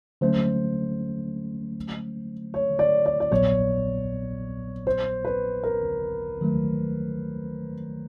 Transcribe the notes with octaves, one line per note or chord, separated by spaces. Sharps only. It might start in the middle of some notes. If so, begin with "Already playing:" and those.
D3 F#3 A3 C#4 C5
C#5
D5
D5
D5
A#1 A#2 F#3 B3 C#5
C5
B4
A#4
D#3 F#3 A3